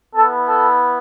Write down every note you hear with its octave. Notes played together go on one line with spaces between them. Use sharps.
B3 E4 A4
A4